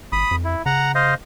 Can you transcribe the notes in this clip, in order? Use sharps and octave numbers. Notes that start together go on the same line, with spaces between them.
G#1 B5 D#6
F2
E4
C#3 F#5 A#5
C5 D#5 F5